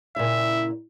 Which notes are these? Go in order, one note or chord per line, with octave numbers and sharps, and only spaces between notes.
A#2 C#3 E4 E5